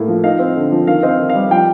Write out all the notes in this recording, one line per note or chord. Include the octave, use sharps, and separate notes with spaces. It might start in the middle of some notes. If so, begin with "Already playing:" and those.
Already playing: A2 A#3
F3
D#4 F5
C4
D3
F3
D#3 F5
C4 D#5
F5
D#3
F5
G3
F3 G5